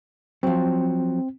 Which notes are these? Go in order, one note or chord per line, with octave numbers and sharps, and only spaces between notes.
F3 F#3 C4